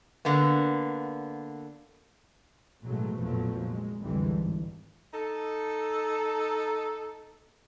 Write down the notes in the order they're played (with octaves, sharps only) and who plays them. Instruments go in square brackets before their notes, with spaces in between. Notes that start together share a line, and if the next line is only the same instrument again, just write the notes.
[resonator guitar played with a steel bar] D3 A#3 B3
[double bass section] A1 B2 F#3 G#3 A3
F1 A#1 B2 F3 F#3 A3
A#2 G#3
C2 F2 D3 E3 G3 G#3
G#1 G#2
[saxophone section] D#4 A4